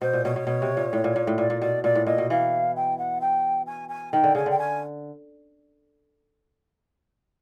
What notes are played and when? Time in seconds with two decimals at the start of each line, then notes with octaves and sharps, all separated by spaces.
0.02 B2 C5
0.13 A#2
0.25 B2 C#5
0.36 B2
0.47 B2
0.62 C3
0.77 A#2
0.93 A2
1.04 A#2
1.16 A#2
1.27 A2
1.38 A#2 D5
1.50 A#2
1.62 B2 D5
1.84 A#2 D5
1.95 A2
2.06 A#2 D#5
2.18 B2
2.30 E3 F5
2.76 G5
2.98 F#5
3.21 G5
3.66 G#5
3.89 G#5
4.13 D#3 G5
4.24 D3
4.35 C#3 G#5
4.46 D3 G5
4.59 G#5